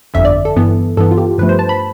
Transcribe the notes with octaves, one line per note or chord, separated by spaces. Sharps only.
G1 F2 D3 E5
D5
A4
G2 E3 B3
G2 E3 B3 A4
F4
G4
G2 F3 A3 B4
C5
A5
B5